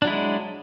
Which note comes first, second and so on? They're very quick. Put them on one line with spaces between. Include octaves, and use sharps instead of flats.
D4 F#3 E4 G#3